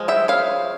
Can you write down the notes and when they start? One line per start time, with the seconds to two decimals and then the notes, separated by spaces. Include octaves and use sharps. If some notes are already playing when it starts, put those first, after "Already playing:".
Already playing: F3 G#3
0.08 E5 G5
0.28 C#5 F5